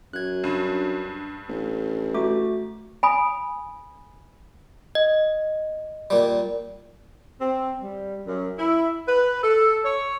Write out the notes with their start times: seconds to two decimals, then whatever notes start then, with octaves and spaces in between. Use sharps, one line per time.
0.13 F#2 F#6 G#6
0.44 G2
1.49 A1
2.14 A3 F#4 D6
3.03 G#5 B5 D#6
4.95 D#5
6.10 A#2 G3
7.39 C4
7.80 G3
8.24 F#2
8.57 E4
9.07 B4
9.43 A4
9.83 C#5